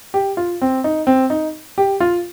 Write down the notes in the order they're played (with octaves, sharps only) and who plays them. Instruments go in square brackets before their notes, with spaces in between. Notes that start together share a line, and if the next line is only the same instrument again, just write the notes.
[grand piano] G4
F4
C4
D#4
C4
D#4
G4
F4